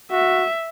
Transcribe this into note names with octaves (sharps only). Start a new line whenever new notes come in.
F#4 E5